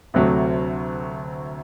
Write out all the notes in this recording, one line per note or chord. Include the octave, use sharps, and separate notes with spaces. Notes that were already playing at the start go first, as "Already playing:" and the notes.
D2 C3 F#3 A3